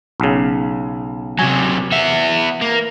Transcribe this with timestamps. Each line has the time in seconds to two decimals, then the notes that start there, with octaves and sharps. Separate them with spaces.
0.20 B1 C#3
1.39 C3 F#3 G#5
1.92 B3 E5
2.61 A#3